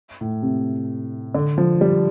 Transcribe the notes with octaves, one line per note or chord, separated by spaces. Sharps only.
A2
C3
D3
F3
G3